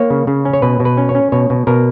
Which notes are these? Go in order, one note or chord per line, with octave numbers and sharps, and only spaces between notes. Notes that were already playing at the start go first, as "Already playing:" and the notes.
Already playing: A#3 C#5
C#3
C#3
C#4
C#5
B2 B4
B2
B4
C#4
C#5
C#4
B2 C#5
B2
B2 A#4